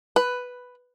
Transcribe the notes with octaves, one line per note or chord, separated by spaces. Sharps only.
B4